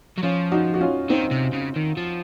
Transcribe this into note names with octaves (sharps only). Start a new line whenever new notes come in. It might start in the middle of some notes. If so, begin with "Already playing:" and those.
F#3
F3 C#4 F4
D#4 F#4
F#4
C#4 F4
D#3 C4 D#4
C3
C#3
D#3
F3